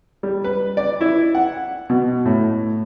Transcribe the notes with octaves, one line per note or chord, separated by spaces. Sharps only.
G3
B4
D5
E4
F#5
B2
A2